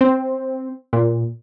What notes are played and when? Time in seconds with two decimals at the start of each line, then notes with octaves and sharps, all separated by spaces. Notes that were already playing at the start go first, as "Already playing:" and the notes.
0.01 C4
0.93 A#2